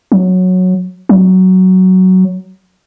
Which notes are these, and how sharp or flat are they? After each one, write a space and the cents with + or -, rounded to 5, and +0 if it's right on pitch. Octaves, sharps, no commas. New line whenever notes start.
F#3 -10
F#3 +10